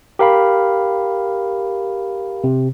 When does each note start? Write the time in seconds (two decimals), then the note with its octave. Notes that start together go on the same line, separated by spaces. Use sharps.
0.19 G4 A#4 F5 B5
2.44 C3